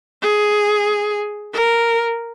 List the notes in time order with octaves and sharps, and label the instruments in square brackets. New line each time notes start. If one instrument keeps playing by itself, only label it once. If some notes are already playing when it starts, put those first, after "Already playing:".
[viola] G#4
A#4